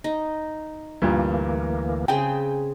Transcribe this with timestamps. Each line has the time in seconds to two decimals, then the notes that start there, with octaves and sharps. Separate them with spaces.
0.04 D#4
1.02 D2 G2 A#2 E3 A#3
2.08 C#3 C4 G#4 G5